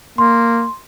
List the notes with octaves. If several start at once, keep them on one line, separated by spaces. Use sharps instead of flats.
A#3 C6